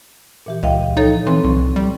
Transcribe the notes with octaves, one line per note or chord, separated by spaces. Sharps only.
A#2 E3 G4
C#2 D#5 F5 G5
F3 D#4 A4 C#5
E3 C4
C2 C#6
G3